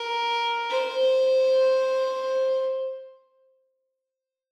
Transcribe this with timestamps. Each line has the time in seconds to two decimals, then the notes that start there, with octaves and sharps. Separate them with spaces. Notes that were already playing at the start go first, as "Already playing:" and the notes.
Already playing: A#4
0.70 C5